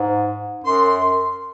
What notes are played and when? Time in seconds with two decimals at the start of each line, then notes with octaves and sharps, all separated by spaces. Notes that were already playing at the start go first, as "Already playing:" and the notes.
Already playing: G#2
0.64 F#2 C6